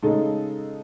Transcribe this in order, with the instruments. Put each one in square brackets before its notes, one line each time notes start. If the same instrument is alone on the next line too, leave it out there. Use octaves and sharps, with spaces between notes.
[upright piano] C#3 G#3 D#4 A4